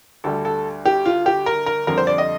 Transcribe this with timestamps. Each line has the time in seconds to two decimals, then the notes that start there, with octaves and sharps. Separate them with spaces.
0.24 D2 D3 G3 A4
0.45 A4
0.85 G4
1.05 F4
1.26 G4
1.46 A#4
1.66 A#4
1.87 F2 D3 G3 A#4
1.98 C5
2.07 D5
2.18 D#5